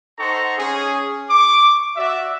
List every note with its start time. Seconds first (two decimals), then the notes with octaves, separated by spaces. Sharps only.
0.19 D#4 A4 C5 F#5 A#5 C#6
0.59 C#4 G#4
1.30 C#6 D6
1.97 F#4 D5 E5